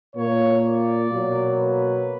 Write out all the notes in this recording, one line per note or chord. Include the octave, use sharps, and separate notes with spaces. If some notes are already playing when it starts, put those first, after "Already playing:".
A#2 A#3 C#5
D5
B2 F#3 A#3
B4